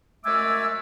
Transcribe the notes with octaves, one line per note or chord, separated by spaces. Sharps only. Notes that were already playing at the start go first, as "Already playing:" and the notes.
F#2 G#3 A3 G#5 D6 E6